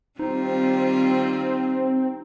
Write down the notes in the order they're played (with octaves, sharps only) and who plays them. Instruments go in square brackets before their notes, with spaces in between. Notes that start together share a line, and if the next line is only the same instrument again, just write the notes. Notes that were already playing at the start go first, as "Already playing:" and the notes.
[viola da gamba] D#3 G3 F4 [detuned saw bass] C4 [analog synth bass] D#4